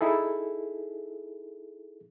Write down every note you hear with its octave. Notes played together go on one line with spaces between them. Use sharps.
D#4 E4 G#4 A4